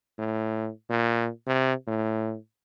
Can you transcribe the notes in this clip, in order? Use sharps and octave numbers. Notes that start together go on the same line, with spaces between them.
A2
A#2
C3
A2